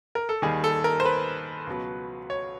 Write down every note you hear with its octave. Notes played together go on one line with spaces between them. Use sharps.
A#4
A4
D#2 D#3 G3 G#4
A4
A#4
C5
B4
C#2 B2 F#3
C#5